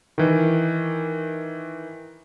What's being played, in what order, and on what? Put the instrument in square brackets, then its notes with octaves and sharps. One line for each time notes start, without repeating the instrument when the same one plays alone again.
[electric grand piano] D#3 E3